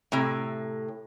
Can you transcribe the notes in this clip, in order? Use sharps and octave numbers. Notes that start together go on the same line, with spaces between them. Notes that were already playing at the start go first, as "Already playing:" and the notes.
A2 C3